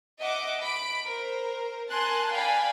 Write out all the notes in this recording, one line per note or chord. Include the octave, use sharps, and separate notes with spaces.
D#5 E5 F#5 D6
B5 D7
A#4 C5
A#4 G#5 A5 C6 F#6
D5 F5 G5 G#5 B5